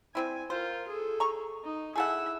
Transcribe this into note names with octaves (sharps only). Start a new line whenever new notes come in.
G3 C4 E4 G#5
F4 A#4 C5
G#4 A4
A#5 C#6
D#4
E4 G#4 A4 E5 F#5